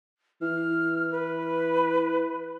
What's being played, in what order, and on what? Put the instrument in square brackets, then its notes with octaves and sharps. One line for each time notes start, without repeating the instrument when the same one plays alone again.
[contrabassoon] E3 [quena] F6
[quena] B4